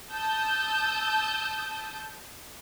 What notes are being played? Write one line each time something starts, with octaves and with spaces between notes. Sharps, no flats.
A5 D#6 E6 G6